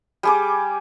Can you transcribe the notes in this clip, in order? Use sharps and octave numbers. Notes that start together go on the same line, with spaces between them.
G3 G#4 D6